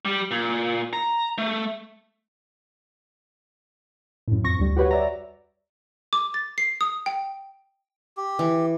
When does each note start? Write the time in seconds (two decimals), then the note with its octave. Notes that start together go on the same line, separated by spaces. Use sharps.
0.05 G3
0.31 A#2
0.93 A#5
1.38 A3
4.28 F#2 A2
4.44 F2 C#6 A#6
4.59 D2 G3
4.77 F#4 G4 B4 C#5 F#5
4.91 D5 E5 A#5
6.13 D6
6.34 A6
6.58 C7
6.81 D#6
7.06 G5
8.17 G4
8.39 E3